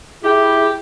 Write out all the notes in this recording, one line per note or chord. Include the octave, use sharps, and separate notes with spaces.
E4 G4 G#4